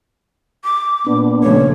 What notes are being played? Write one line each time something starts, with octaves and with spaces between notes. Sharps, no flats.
D6
A#2 B3 D4
C#3 F3 A3 C#5